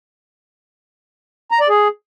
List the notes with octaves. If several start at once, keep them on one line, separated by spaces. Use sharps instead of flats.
A#5
D5
G#4